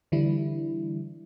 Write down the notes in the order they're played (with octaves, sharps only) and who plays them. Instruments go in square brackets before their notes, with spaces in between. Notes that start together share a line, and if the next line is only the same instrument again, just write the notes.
[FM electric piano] D3 E3 G3 D4 E4